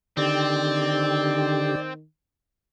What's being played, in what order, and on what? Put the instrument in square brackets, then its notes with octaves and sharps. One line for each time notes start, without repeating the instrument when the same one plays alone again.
[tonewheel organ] D3 G4 [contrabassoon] D#3 [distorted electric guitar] C4 [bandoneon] D5